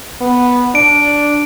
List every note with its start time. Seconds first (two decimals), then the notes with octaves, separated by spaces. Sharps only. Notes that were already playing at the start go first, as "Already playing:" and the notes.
0.21 B3
0.75 D4 D7